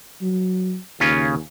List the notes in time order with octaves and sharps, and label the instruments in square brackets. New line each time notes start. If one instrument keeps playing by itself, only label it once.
[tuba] F#3
[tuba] D#2 [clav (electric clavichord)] C#3 C#4 F4